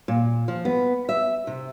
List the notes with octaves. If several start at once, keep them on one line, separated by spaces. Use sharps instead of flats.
A#2
F3
B3
E5
C3